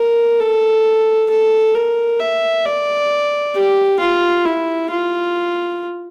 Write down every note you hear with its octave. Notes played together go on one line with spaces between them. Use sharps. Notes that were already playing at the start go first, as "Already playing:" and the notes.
Already playing: A#4
A4
A4
A#4
E5
D5
G4
F4
E4
F4